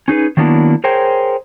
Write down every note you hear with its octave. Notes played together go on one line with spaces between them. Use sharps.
C#4 D#4 G#4 B4
D#3 F#3 A#3 B3 D4 E4
G#4 A#4 C5 C#5 G5